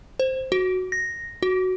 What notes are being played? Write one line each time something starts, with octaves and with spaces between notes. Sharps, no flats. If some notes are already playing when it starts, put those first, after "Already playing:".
C5
F#4
A#6
F#4